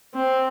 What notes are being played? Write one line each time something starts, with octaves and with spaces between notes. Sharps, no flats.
C4